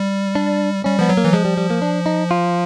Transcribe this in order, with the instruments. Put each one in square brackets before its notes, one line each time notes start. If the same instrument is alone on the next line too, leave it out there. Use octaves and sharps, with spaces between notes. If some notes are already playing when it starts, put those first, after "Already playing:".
Already playing: [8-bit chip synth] G3
[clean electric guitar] D4
[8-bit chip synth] G3 [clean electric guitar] C#4
[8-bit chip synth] F3 [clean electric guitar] B3
[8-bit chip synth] F#3
[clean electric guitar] A#3
[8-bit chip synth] E3
[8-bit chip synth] F3 [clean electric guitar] G#3
[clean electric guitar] G3
G3
A#3
D4
D#4
F4